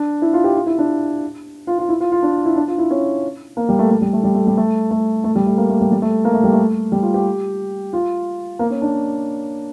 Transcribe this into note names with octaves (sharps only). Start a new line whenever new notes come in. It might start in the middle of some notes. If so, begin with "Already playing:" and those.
Already playing: D4
E4
F4
G4
F4
E4
D4
F4
F4
E4
F4
F4
D4
E4
D4
F4
E4
C#4
A#3
G3
A3
A3
G3
A3
G3
A3
G3
A3
A3
A3
G3
A3
A#3
A3
G3
G3
A3
A#3
A3
G3
A3
G3
F4
G4
F4
A#3
C#4
D4